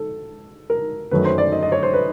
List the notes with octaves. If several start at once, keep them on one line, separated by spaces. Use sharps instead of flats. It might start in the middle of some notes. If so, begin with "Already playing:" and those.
Already playing: A4
A#4
F#2 D#3 F#3 A3 B4
C5
D5
D#5
D#5
C#5
C5
B4